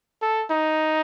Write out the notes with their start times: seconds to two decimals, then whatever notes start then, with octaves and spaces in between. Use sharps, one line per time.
0.22 A4
0.50 D#4